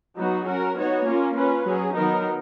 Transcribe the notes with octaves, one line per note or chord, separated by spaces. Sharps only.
F#3 B3 D#4 F#4
C#4 F#4 A#4
B3 D#4 F#4 C#5
A#3 C#4 F4
C#4 F4 B4
F#3 C#4 G#4
D#3 F#3 B3 D#4 A#4